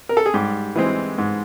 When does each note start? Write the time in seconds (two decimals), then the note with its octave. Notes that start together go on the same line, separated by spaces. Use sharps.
0.09 A#4
0.17 A4
0.26 G#4
0.34 G#2 G3 G4
0.76 E3 G#3 C4
1.18 G#2